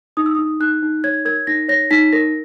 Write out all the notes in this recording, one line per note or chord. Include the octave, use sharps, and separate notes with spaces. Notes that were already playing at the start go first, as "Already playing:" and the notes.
D#4 D#6
E6
D#4 D#6
D#4 F#6
D#4
C#5 G#6
A#4 G#6
D#4 A#6
C#5 A#6
D#4 B6
A#4 A#6